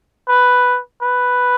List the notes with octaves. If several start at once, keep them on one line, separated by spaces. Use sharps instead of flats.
B4
B4